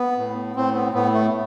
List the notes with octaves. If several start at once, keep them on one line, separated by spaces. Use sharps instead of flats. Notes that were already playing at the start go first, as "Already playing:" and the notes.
Already playing: B3
A2
A2 C4
B3
A2 B3
A3